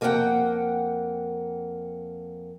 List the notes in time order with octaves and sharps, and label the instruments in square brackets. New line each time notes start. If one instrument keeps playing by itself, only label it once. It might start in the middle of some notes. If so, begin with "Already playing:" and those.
[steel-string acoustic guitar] F2 A#3 D4 A4 F#5 G5